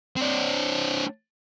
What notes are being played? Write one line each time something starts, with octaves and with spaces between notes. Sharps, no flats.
C4 D4